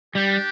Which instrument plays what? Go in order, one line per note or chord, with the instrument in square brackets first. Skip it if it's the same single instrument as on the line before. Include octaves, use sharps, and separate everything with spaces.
[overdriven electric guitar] G3 [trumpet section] D4 G4